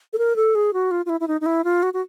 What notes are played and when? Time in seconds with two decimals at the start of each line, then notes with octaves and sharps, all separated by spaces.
0.13 A4
0.18 A#4
0.36 A4
0.55 G#4
0.73 F#4
0.91 F4
1.06 F4
1.09 E4
1.20 E4
1.28 D#4
1.41 D#4
1.46 E4
1.64 F4
1.83 F#4
1.94 F#4